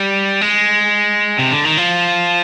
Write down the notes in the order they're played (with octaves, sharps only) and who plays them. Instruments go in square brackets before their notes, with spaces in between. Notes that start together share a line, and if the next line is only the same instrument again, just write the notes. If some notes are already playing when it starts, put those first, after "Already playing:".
Already playing: [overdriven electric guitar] G3
G#3
C3
D3
D#3
F3